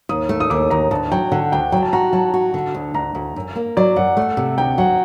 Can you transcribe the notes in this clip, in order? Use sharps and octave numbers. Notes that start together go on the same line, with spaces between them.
D#2 D#6
A3
D#6
D#2 D6
D#2 A#5
D2 A5
F#3 G5
D3 F#5
D2 G5
F#3 G5
A5
F#4 A#5
F#3 A5
F#4
D3
D2
D2 A#5
D2
F#2
A#3
F#3 D5
F#2 F#5
A3
C3
D2 G5
F#3 F#5